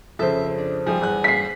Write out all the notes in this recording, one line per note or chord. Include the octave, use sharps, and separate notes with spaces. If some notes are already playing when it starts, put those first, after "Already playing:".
F2 C#3 A4 C5 E5
D4
F3 G3 G#3 G#4
E2 G2 F#6
B6 C7